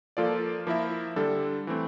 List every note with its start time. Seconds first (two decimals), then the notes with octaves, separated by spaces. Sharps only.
0.17 F3 A#3 F4 A4 D5
0.67 F3 A#3 E4 A#4 E5
1.16 D3 G3 D4 A4
1.67 E3 A3 C4